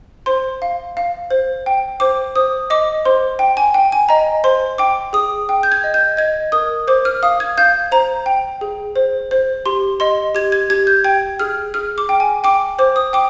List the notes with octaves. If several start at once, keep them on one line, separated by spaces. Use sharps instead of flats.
C5 C6
F5
F5
C5
G5
C5 D6
C5 D#6
D#5 D6
C5 C6
G5
G#5
G5
G#5
D#5 A#5
C5 C6
G5 D6
G#4 D#6
G5
G6
G#6
D#5
G6
D#5 G#6
A#4 D#6
C5 D6
F6
F5 D#6
G#6
F5 G6
C5 A#5
G5
G#4
C5
C5
G4 C6
D#5 C6
G4 G#6
G#6
G4 G#6
G6
G5 G#6
G#4 F6
G#4 F6
D6
G5
G#5
G5 D6
C5 D6
D#6
G5 D6